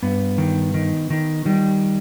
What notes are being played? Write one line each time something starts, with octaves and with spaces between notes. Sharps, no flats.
G2 B3
D#3
D#3
D#3
D#3 G3